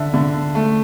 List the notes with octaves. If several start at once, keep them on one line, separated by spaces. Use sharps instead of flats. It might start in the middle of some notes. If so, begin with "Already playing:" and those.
Already playing: D3 E5
D3
A3